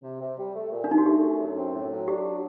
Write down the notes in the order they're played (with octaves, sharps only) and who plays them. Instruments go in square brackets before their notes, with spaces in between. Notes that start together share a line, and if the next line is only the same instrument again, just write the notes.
[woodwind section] C3
C3
G3
A3
A#2
[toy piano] D4
[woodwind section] C2 [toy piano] D#4
[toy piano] F#4
[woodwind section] A3 [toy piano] G4
[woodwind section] F#2
F#2
C4
A2
F#3
[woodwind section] D4 [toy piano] G4
[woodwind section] F#3